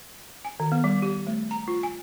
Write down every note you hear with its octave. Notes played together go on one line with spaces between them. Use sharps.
G#5
D#3
B3
G3
G4
A3
A#5
F4
G#5